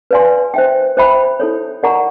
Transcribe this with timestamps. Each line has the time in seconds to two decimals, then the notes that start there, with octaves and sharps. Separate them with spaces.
0.11 B4 D5 F5 G#5 C6
0.54 C5 E5 G5
0.97 C5 E5 G5 B5
1.40 E4 A4 C#5
1.83 A#4 D5 F#5 A#5 C#6